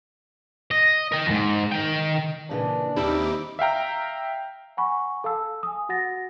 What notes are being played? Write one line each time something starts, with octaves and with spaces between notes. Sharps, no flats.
D#5
A#4 G5
F2 G#2
D#3 G5
A#2 C#3 E3 D4
D#2 G3 C4 D#4 E4 E5 D6
E5 F5 G5 A#5
F#5 G#5 B5 C#6
A4 F5 A5 E6
G#5 D#6
F#4 F#5 A6 A#6